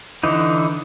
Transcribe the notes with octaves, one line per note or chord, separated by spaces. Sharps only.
D3 E3 D#4